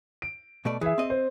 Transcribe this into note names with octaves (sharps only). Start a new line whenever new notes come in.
D7
B2 A3 D5
E3 G#4 E5
C4 D#5
C5